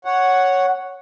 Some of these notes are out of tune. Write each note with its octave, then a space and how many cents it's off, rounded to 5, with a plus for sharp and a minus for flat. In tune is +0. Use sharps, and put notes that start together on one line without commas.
C#5 +0 F#5 +0